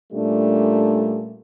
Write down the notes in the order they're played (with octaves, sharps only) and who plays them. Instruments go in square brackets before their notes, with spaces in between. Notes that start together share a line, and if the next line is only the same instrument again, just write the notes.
[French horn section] A#2 G3 A3 C#4 D4